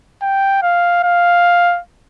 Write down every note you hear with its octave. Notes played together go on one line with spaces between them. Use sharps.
G5
F5
F5